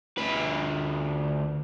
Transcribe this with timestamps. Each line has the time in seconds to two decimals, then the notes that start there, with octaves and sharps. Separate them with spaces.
0.18 D2 B4